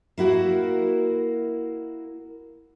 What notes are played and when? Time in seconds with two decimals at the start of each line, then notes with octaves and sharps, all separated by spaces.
0.18 A#3 E4 F#4 A#4